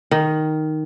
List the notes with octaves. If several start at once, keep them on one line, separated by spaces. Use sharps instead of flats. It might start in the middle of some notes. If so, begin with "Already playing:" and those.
D#3